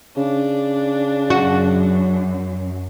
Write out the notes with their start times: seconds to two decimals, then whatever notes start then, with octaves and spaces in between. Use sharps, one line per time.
0.17 C#3 D4
1.30 F#2 F#4